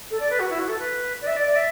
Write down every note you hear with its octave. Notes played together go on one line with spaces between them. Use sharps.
A4
D5
B4
F#4
E4
F#4
A4
B4
D5
E5
D5
D5
E5